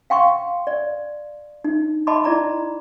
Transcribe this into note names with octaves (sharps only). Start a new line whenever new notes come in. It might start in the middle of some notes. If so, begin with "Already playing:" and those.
F5 G5 C6 C#6
D5
D#4
D#5 A5 B5 C6 D6
E4 D5 A#5 D6